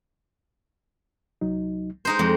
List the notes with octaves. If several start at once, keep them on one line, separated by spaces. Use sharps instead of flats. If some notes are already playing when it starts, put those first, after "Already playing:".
C2 F#3 D#4
G#3 D#4 C5
F2 G#3